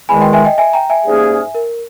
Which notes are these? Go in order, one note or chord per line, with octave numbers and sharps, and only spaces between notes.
E2 D#3 G#3 G#5 B5
D#5 G5
E5 G#5
D#5 G5
E5 G#5
G5 A#5
E5 G#5
G#2 G3 A#3 C#4 G#4
A#4